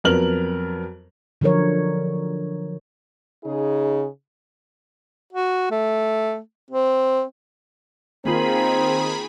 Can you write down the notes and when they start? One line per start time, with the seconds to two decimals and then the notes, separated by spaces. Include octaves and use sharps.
0.04 F2 F#3 B3 A#4 F6 F#7
1.41 D3 F3 F#3 A#4 C#5
3.44 C#3 D#4 G#4
5.33 F#4
5.71 A3
6.71 C4
8.25 D#3 A#3 C4 F4 G#4 A#5 B5